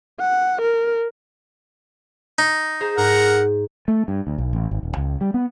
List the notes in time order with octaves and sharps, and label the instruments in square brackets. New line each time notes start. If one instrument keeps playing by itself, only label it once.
[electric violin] F#5
A#4
[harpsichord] D#4
[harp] G#4 C5 A#5
[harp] G#2 [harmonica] A#4 F#5
[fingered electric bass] A3
G2
D2
B1
A1
G#1
D#1
C#2
G3
B3